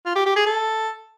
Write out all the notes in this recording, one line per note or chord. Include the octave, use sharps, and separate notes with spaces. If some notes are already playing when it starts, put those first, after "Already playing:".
F4
G4
G4
G#4
A4